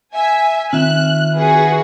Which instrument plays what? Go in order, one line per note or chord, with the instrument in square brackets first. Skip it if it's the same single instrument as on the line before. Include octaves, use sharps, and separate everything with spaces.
[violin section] E5 G#5
[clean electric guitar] D#3 [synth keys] C4 [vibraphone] F4 E5 [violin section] F#6
[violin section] F#4 G#4 B4